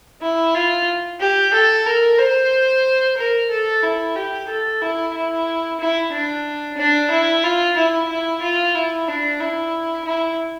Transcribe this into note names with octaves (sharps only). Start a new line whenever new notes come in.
E4
F4
G4
A4
A#4
C5
A#4
A4
E4
G4
A4
E4
E4
E4
D4
D4
E4
F4
E4
E4
F4
E4
D4
E4
E4